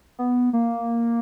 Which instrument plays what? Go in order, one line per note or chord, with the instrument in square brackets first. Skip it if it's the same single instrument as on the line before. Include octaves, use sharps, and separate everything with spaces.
[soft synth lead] B3
A#3